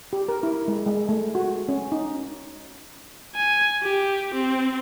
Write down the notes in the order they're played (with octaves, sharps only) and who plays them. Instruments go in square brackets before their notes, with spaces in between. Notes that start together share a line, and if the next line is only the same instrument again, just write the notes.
[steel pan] G4
A#4
E4
G#3
G#3
A3
F#4
C#4
D#4
[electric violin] G#5
G4
C4